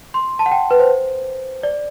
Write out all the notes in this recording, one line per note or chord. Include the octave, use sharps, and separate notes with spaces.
C6
A5
F#5
G5
B4
C5
D5